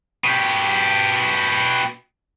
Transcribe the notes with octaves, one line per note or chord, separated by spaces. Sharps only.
B2 G4